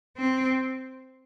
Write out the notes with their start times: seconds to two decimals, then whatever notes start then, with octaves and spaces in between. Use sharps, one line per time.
0.17 C4